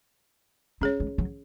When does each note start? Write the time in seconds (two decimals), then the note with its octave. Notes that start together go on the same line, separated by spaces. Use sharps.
0.81 G#3 C#4 G#4 C#5
1.00 G#3
1.18 F#3